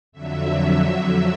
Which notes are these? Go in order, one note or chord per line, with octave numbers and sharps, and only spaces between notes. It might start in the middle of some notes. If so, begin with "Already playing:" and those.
F2 D3 F#3 E5